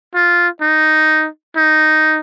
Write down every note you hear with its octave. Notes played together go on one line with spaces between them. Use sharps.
F4
D#4
D#4